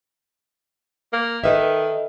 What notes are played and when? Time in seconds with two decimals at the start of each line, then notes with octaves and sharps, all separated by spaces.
1.13 A#3
1.44 D#3 A4 B4 E5